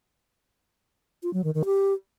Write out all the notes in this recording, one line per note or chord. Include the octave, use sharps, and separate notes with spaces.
F4
F#3
D#3
D#3
G4